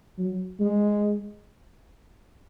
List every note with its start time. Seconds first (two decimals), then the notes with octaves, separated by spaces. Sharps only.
0.18 F#3
0.60 G#3